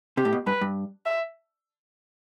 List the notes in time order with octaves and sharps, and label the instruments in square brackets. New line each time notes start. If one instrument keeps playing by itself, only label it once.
[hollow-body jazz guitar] C3 [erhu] G4
[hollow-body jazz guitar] A2
B2
[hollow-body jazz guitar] G2 [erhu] B4
[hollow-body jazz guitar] G2
[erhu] E5